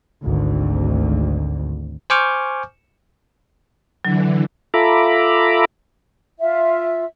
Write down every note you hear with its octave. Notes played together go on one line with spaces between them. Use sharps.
G#1 D2
C5 G#5 C#6 D6 F6 G6
D3 E3 F#3
F4 A4 E5 A#5 B5 D6
F4 E5